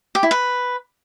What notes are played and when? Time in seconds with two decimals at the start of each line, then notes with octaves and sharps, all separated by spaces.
0.15 G4
0.23 E4
0.31 B4